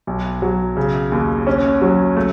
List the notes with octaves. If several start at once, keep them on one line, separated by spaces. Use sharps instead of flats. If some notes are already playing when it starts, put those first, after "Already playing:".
B1
F#3
C#3
D#2
C#4
F#3
A3